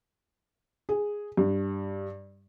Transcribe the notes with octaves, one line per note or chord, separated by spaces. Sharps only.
G#4
G2